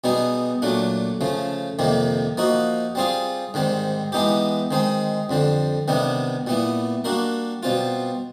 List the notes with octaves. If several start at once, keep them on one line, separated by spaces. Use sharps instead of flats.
B2 G3 B3 D#4 G#4
A#2 F#3 A3 D4
C#3 F3 A3
F2 C3 D#3 G3 A#3
F3 A#3 D#4 F#4
G3 C4 F4 G#4
G#2 D#3 G3 C4
E3 G#3 B3 D#4 G4
D#3 G#3 C4 D#4
F2 D3 G3 C4
C3 D#3 G3 B3 D4
A#2 G3 B3 E4
G3 A#3 D4 F#4 A#4
B2 G3 C4 F4